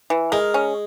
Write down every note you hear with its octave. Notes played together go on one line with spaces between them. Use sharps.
E3
G#3 A#4
C#4